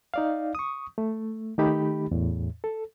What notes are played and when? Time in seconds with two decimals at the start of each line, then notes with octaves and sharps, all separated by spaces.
0.14 D#4 D5 F5
0.55 C#6 D#6
0.98 A3
1.58 D#3 A3 D#4 G4 B5
2.11 E2 A2
2.64 A4